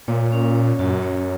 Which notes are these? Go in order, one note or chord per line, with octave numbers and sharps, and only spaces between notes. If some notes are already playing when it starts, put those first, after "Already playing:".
A#2 C#5
C#4
C#5
F#2 F#4
C#5